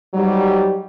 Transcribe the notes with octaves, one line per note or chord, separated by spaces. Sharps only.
G#2 F#3 G3